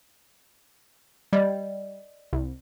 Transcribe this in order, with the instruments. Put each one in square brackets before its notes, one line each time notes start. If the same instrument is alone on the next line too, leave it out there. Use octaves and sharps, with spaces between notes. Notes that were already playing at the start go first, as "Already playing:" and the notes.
[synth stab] G3 [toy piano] D5 D#5
[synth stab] C2